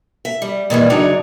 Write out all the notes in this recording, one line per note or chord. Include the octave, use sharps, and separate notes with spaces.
E5
G3
A#2 D#3 E3 G3
F#2 C#3 F#3 D4 D#4 C#5